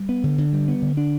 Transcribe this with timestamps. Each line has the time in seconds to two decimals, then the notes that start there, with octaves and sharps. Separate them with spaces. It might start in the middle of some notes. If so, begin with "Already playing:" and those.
Already playing: G3
0.09 B3
0.24 D3
0.38 D3
0.53 G3
0.68 B3
0.82 D3
0.97 D4